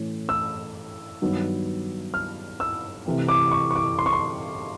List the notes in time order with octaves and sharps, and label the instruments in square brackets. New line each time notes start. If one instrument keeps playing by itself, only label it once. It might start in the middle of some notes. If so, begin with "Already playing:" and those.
Already playing: [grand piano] A2 E3 A3 C#4
E6
G2 D#3 F#3 B3
F6
E6
C3 E3 A3 C4
D6
C#6
C#6
D6
C6
C#6
C6